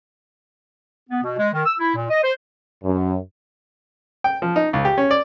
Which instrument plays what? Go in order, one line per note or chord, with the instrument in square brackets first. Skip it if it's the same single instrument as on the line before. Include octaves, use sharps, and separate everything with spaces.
[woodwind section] B3
B2
G#3
D#3
E6
E4
A#2
D#5
C5
[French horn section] F#2
[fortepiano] G5
F3
D#4
C#2
G4
C#4
D5